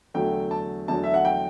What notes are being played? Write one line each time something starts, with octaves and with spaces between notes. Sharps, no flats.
E2 D3 F#3 A3 G5
A5
E2 D3 F#3 A3 A5
E5
F#5
G5